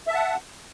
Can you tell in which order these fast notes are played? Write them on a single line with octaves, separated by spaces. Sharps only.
E5 A5 F#5